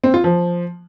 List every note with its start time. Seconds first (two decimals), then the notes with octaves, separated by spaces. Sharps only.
0.04 C4
0.14 F4
0.24 F3